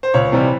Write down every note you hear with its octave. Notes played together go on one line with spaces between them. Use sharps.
C5
C#2 C#5
C3 E3 G3